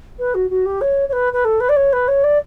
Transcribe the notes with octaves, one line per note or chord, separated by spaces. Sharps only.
B4
F#4
F#4
G4
C#5
C#5
B4
B4
A4
B4
D5
C#5
B4
C#5
D5